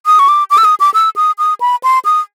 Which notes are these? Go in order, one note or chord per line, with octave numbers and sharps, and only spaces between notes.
D#6
C#6
D6
D6
E6
D#6
D6
E6
D#6
D#6
B5
C6
D#6